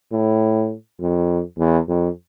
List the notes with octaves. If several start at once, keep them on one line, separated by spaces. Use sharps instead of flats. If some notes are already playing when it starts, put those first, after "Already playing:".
A2
F2
E2
F2